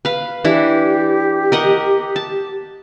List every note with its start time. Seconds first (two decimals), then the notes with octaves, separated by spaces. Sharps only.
0.05 B4 F5
0.44 E3 D4 E4 G4
1.52 A#4 D#5 F#5
2.16 A5